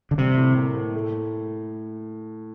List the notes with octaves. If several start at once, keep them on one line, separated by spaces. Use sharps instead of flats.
D3
C3 G3
A2
A#3
A2
A3